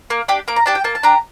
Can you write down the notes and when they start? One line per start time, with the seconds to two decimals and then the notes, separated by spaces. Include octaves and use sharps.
0.10 A#3
0.28 D4 G4
0.48 A#3 D6
0.56 A#5
0.66 D4 G4 A5
0.75 G5
0.84 A#3 A5
0.95 A5
1.03 D4 G4 A#5